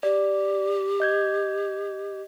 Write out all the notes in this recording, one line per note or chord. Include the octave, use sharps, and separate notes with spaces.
G4 D5
D#5 G6 G#6